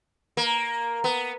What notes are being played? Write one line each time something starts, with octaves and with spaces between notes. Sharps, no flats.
A#3
B3